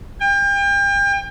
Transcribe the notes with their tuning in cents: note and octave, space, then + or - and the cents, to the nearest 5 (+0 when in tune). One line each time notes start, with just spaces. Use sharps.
G5 +35